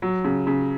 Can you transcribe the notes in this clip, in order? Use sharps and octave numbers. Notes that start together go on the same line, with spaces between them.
F#3
C#3
C#3